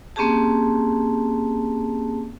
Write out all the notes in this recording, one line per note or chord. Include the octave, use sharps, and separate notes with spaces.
A#3 C4 C#4 G4 G#4 A5